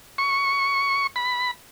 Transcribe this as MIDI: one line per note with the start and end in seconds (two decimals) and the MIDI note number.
0.18 1.07 85
1.16 1.51 83